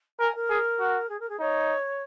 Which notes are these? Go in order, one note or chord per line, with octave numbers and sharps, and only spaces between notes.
A#4 G#5
A#4
G#4
F#4
G#4
A#4
G#4
D#4 C#5